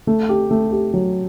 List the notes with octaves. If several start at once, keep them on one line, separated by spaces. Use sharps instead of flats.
A3
G4
A3
G4
F#3